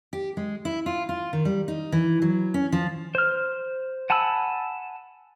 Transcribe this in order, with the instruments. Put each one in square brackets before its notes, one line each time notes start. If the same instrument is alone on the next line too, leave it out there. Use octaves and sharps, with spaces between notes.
[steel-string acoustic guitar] G4
G#3
E4
F4
F4
D#3
G3
D#4
E3
F#3
C#4
F3
[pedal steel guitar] C5 F6
F#5 G#5 A5 B5 E6